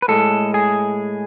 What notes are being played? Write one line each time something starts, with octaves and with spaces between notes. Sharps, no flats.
B4
A2 G#3 A4
G#4